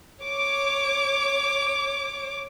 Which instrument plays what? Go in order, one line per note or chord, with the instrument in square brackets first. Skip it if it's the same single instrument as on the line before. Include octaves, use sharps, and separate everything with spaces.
[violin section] C#5 D6